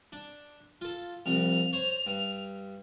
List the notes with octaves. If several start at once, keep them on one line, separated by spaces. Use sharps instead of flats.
D4
F4 A4
C2 F2 F7
C5 C#5
G2